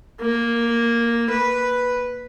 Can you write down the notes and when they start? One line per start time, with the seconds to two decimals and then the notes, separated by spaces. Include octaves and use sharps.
0.20 A#3
1.30 B4